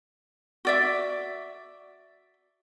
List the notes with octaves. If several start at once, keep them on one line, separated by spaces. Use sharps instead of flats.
F#4 D5 E5